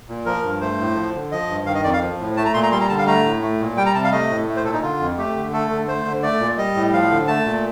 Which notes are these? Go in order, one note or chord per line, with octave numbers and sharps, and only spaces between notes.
A#2
F3 A#4
G2
A3 C5
A2
F3
D3
F3 D#5
G2
D#3 F5
D#5
F2 D5
F5
F3
A2
A3 A5
A#5
A#2 C6
A#5
G3 C6
A#5
D3 A5
F5
A3 A#5
A2
A3
A#2
G3 G5
A#5
C3 A5
F5
A3 D#5
A2
A3
C5
A#2 A4
D#4
D3 F4
F2
A3 G4
D3
A3 A4
D3
A3 C5
D3
A3 D5
A#2
G3 D#5
A2
F3 F5
D3
A3 A5
A#2